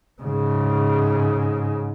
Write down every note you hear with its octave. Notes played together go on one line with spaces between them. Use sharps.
G#2 C#3